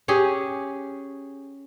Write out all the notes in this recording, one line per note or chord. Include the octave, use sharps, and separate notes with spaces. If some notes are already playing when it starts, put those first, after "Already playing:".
C#4 G4 G#4